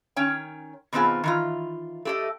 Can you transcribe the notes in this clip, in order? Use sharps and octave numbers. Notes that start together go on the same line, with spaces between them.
D#3 C#4 C#5 G5
B2 D#3 B3 C4 F4 G#4
D#3 E3 F4
A3 G4 D#5